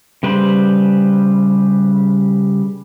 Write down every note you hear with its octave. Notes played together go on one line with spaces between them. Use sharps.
C#3 G3 B4 C5